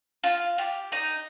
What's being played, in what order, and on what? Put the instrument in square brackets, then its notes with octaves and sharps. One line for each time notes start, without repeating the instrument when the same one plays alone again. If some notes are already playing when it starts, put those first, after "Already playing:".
[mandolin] F4
G4
D#4